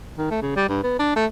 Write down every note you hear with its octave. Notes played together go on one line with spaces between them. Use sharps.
D#3
A3
C#3
G3
G2
B3
D4
A3